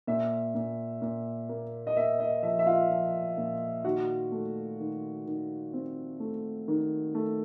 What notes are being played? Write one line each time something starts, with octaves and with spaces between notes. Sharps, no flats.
A#2 E5
A#2
A#2
A#3
D#5
A#3 E5
D#5
F3 E5
E5
F4 F5
F3
A#2
D#3 F#4 F#5
A3
D#3
D#3
C4
A3
D#3
A3